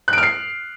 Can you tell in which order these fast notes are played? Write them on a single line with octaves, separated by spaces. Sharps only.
F#6 D7 F6 C7